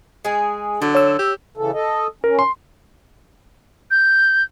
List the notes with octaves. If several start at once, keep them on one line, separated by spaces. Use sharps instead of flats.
G#3 G#4
D3 F#3
C#5 E6
G4
C#3 E3 A4
A4 D#5
C#4 A#4
C6
G6